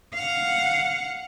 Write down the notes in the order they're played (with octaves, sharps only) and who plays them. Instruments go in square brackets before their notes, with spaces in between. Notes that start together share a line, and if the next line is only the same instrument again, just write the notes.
[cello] F5 F#5